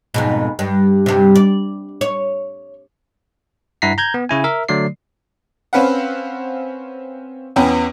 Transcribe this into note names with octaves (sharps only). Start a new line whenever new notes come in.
F2 G#2 B2
G2
G2 C3
D5
C#5
G2 E4 F#5 A#5 B6 C7
A#5 G6 G#6
B3
C#3 E4 G#5
A#4 E5
D3 F#3 A3 D5 C7
C4 C#4 B4 F5 F#5
E2 B3 C#4 B4 G5